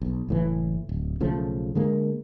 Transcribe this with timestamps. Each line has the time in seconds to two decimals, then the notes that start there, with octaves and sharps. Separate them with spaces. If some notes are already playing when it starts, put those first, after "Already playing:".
0.02 B1
0.29 F#1 A2 E3
0.89 D1
1.20 B1 C#3 F3 A3
1.75 D3 G#3 A#3